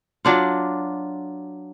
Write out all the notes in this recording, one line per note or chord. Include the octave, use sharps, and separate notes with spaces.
F#3 D4 F4